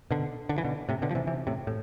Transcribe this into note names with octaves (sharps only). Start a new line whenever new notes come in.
B2 D3
D3
E3
B2 D3
A2 C3
B2 D3
F3
C3 E3
C3 E3
A2 C3
A2